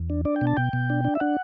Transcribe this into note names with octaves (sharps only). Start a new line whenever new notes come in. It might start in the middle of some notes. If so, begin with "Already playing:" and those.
Already playing: E2
D4
D4 D5
G5
B2
A5
B2 G5
B2
D4
D4
E5
D4 F#5